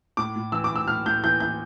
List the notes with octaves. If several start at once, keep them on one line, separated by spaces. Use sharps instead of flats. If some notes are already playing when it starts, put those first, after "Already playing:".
A2 D6
A2
E3 E6
D6
A2 E6
A2 F6
A2 G6
E3 G6
E3 G6